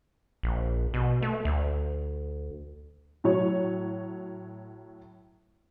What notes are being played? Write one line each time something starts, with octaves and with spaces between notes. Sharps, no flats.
A#1
B2
A3
D2
A2 F#3 C#5